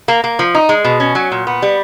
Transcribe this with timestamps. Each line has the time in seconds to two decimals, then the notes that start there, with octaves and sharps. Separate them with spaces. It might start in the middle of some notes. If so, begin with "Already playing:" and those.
0.08 A#3
0.24 A#3
0.39 F3
0.55 D#4
0.69 G#3
0.85 B2
1.00 C#4
1.15 F#3
1.32 A#2
1.47 B3
1.62 G3